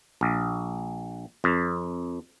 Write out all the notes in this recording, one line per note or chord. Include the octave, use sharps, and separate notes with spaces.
A#1
F2